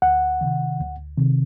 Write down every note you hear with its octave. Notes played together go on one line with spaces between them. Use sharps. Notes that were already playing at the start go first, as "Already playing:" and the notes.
D2 F#5
C3 D#3
D2
C3 D#3